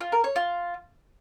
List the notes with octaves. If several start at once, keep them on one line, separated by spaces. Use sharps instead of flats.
F4
A#4
C#5
F4